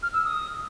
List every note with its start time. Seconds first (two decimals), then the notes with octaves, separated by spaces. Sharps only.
0.03 F6
0.14 E6
0.25 D#6